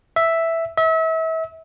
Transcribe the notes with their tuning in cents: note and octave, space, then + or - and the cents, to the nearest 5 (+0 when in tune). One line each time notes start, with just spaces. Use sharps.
E5 +0
E5 -35